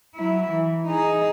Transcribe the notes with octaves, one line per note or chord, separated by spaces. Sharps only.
F#3 E4
E3
D#4 G#4